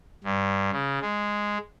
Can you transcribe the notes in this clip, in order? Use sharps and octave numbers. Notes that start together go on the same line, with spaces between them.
G2
C#3
G#3